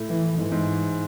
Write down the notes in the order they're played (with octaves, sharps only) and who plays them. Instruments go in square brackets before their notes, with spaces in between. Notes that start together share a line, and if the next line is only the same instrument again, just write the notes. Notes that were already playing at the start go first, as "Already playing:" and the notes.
Already playing: [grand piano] A2
[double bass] E3
[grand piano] G#2 [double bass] E3
[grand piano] G#2